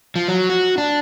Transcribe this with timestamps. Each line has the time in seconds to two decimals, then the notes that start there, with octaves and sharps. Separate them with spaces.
0.16 F3
0.28 F#3
0.49 F#4
0.78 D4